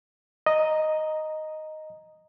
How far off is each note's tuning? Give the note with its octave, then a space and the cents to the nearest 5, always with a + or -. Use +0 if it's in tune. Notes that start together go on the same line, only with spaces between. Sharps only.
D#5 +0 A#5 +0